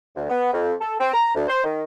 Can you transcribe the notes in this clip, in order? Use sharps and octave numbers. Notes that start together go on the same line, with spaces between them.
D2
B3
F2
A4
C4
A#5
D2
C5
D#3